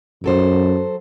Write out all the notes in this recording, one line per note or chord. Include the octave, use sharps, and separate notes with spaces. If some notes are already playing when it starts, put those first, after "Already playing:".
F#2 F#3 A4 C5